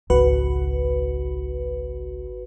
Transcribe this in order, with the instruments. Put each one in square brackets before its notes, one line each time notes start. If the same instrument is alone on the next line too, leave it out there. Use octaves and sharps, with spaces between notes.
[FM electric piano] G#1 F#4 B4 [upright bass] C#2